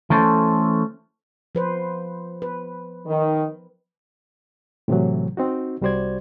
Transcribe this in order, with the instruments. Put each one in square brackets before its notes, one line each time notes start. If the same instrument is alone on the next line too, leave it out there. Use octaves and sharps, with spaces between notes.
[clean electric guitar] E3 A3 C#4 A4 C5
[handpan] F3 B4 C5
B4
[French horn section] D#3
[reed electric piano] A2 C3 E3 F#3
C4 D#4 F#4
C2 G3 F#4 C5 D5 G#6